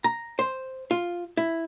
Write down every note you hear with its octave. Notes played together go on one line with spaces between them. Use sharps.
A#5
C5
F4
E4